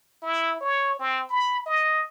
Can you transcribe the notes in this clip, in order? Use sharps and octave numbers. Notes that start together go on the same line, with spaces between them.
E4
C#5
C4
B5
D#5